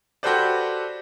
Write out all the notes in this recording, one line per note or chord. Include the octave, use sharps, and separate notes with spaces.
F#4 G4 A4 B4 C5 D5